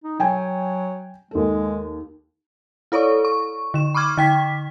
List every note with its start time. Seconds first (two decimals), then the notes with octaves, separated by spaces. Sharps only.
0.04 D#4
0.20 F#3 G5 G#5
1.31 D#2 G#3 A4
2.92 E4 A4 C#5 D5 C#6
3.25 C#6
3.74 D3 E7
3.95 B5 C#6 D6 F6 G#6
4.17 D3 G5 B6